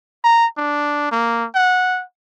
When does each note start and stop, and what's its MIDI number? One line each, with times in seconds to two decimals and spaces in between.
0.24 0.46 82
0.58 1.10 62
1.12 1.45 58
1.55 2.03 78